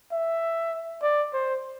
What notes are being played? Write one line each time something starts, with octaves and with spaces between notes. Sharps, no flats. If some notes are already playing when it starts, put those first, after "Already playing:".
E5
D5
C5